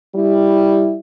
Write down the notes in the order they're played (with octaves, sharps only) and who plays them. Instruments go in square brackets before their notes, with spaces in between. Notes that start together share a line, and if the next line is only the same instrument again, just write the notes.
[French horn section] G3 E4